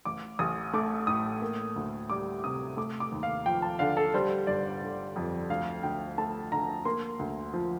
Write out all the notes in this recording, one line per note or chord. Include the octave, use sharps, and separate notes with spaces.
A1 D6
A1 D#6
A3 D6
A2 D#6
A#3
D2
G3 D6
C3 D#6
A3 D6
D6
D#2
F5
F3 G5
A5
D3 F5
A4
G3 C5
G1 D5
D3
F2
D2 F5
D2 G5
A3 A5
D3 A#5
A#3 C6
D2
F3